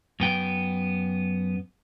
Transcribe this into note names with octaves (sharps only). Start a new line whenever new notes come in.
F#2 B3 G5